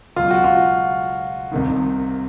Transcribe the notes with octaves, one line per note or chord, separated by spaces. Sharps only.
C#2 B2 F#3 F4
F#4
F4
C2 C3 D#3